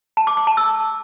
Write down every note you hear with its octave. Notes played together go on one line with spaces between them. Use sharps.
A5
D6
D6
A5
E6